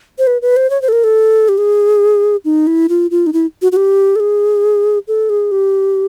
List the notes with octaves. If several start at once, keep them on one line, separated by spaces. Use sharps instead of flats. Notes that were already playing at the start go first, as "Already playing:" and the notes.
C5
B4
B4
C5
C#5
C5
A4
A#4
A4
G4
G#4
D#4
E4
F4
F4
D#4
E4
F#4
F#4
G4
A4
G#4
A4
G#4
G4